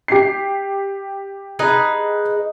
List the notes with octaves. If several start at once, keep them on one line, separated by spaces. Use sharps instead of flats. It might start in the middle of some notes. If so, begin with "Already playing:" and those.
G4 C7
D#4 G#4 B4